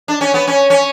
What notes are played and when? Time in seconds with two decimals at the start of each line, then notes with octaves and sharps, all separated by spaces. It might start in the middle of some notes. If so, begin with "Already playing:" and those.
0.08 D4
0.21 C#4
0.34 B3
0.48 C#4
0.70 C#4